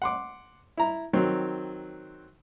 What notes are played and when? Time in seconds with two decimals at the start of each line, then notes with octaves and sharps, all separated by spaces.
0.02 F#5 C6 D6
0.77 E4 A#5
1.13 D#3 F#3 C4